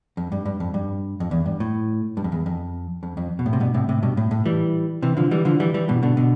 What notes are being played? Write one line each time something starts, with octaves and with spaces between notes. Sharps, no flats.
F2
G2
G2
F2
G2
F2
E2
G2
A2
G2
F2
E2
F2
F2
F2
B2
A2
C3
G2 B2
A2 C3
A2 C3
G2 B2
A2
A2
E3 G3
C3 E3
D3 F3
E3 G3
D3 F3
E3 G3
E3 G3
G2 B2
B2 D3
B2 D3